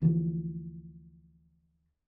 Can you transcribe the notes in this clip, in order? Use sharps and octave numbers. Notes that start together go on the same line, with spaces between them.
D2 E3 F3